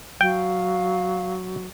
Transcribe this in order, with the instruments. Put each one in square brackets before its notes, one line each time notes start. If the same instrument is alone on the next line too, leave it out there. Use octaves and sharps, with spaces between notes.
[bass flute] F#3 [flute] F5 [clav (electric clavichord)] G5